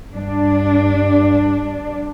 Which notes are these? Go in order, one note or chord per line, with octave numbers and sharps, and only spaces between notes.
G2 D4